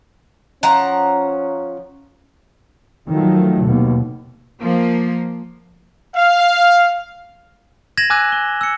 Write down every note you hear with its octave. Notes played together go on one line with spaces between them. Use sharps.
F3 C#4 F#5 A#5
D#3 F3 F#3 A3
D#2 B2
F3 A#3
F5
G#6 A#6 D#7 E7 F#7
G#5 D6 E6 F#6 G#6 D#7
G7
E6 C#7